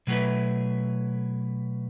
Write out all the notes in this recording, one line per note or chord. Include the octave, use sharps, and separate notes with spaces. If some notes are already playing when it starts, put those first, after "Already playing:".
B2 F#3 A3 E4 B4